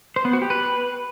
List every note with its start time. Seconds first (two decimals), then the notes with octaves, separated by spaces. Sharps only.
0.16 C5
0.25 B3
0.33 F#4
0.42 G4
0.50 B4